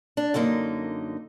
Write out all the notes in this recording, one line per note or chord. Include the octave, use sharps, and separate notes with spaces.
D4
F#2 D3 A#3 D#4